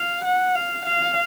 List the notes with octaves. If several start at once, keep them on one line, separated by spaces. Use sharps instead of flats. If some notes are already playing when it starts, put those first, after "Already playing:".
Already playing: F5
F#5
F5
F5